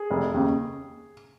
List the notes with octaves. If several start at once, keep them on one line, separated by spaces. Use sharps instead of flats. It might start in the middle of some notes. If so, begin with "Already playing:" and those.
Already playing: G#4
F1
D#2 C#3